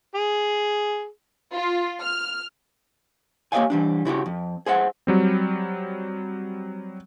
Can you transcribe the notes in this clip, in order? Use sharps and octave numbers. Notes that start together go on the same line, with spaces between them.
G#4
F4
F6
A#3 G4 C#5 D#5 F5 G#5
E3 G3 D4
C#3 E4 F#4 G4
F2
G#4 C5 E5 F#5
F#3 G3 C4